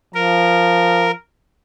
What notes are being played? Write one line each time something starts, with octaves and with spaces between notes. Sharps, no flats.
F3 A#4